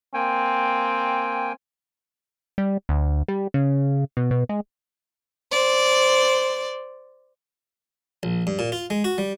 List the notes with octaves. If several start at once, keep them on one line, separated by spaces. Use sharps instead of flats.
A#3 C4 G5 G#5
G3
D2
G3
C#3
B2
B2
G#3
C5 D5
A#1
G2
A#2
F4
G#3
F#4
G3